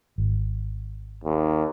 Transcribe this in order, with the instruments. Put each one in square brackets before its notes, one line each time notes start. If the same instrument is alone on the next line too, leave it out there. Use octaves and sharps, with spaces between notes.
[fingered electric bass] G#1
[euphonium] D#2